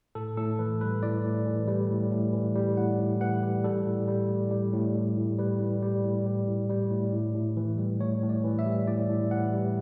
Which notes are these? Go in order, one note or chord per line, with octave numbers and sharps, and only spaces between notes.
A2 A4
A2 A4
E3 B4
G3 B4
A2 D5
A2
E3
G3
A2
A2
E3
G3
A2 F#5
A2
E3 F#5
G3
G3 A4
A2
G3
A2
G3
A2
G3
A2
G3 B4
A2
G3
A2
G3
A2
G3
A2
A2
A2
E3
G3
A2 C#5
A2
D5
E3
E5
G3
A2 D5
A2
E3 F#5
G3